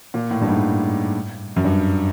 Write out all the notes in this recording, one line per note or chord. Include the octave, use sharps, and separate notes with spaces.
A#2
A2
G2
G#2
F#2
G2